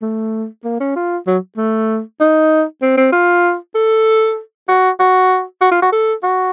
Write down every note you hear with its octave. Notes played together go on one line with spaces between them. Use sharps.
A3
A#3
C#4
F4
F#3
A3
D#4
C4
C4
F4
A4
F#4
F#4
F#4
F4
F#4
A4
F#4